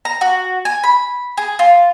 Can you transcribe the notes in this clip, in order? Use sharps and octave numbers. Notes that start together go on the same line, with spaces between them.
A#5
F#4
G#5
B5
G#4
F4